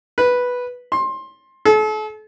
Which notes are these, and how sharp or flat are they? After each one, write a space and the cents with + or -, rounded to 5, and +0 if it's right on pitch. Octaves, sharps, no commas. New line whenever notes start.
B4 -5
C6 +20
A4 -40